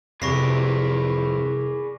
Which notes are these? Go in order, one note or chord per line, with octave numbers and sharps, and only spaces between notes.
C2 F2 G#4 B4 D5 C#6 A#6 C7